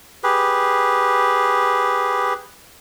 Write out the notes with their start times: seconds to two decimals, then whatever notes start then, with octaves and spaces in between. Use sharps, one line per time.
0.24 G4 G#4 B4